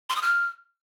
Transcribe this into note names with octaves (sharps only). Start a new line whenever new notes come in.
C6
D#6
F6